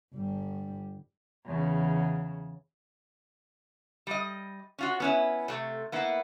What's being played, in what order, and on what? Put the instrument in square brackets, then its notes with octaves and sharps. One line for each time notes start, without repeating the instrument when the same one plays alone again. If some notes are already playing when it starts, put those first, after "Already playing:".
[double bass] G1 G3
[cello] E2 C#3
[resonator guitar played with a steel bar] G3 D#5
C#4 F4 F#4
B3 C#4 E4
C3 A3
A#3 B3 E4